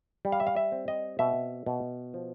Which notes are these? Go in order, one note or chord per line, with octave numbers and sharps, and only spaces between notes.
G3
F5
E5
F5
E5
C4
D#5
B2 E5
B2
F3